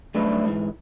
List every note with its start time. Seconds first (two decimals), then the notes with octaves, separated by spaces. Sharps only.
0.15 F#2 G3 A3 D4 B4 E5
0.45 G#2 E3